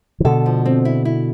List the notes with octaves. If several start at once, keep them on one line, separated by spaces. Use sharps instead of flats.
E3
B2 D3 A4
F3
C4
E4
E4